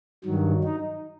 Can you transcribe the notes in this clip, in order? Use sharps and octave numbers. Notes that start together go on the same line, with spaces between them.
G2 D#3 F#3
D#4